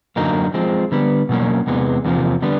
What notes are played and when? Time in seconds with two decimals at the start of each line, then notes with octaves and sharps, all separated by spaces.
0.16 F#2 D3 F#3 A#3 D#4
0.54 F3 G#3 C4
0.92 D3 G3 B3
1.29 B2 F#3 A#3 C#4
1.67 E2 C3 E3 G#3 B3
2.05 E2 C3 F3 A#3
2.42 D3 G3 B3